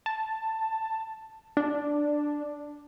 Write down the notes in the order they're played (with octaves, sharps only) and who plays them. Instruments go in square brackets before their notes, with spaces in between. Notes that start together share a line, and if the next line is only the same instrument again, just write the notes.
[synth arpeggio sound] A5
D4